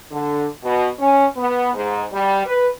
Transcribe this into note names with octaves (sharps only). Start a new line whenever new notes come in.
D3
B2
C#4
B3
G#2
G3
B4